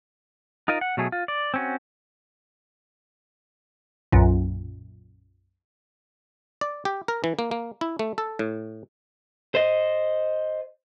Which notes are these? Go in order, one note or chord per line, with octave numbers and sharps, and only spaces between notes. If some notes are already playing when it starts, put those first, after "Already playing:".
D#4 F4 A#4 D#5
F#5
B2 F#3 A3 G#4
F4
D5
C4 C#4 F#4
B1 F#2 A#2
D5
G4
A#4
E3
A#3
A#3
E4
A3
A4
A2
C5 D#5